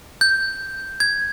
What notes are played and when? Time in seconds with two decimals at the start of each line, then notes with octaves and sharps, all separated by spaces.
0.21 G6
1.00 G#6